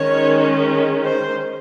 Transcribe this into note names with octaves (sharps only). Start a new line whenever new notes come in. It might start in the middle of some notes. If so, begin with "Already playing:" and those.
Already playing: D#3 G#3 C#4 C#5
C5